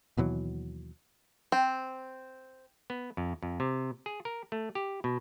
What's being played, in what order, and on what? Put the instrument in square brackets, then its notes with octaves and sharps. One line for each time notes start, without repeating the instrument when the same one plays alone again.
[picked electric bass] D#2 B2 E3 F#3
[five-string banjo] C4
[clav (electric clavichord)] B3
F2
F2
C3
G#4
A#4
A3
G4
B2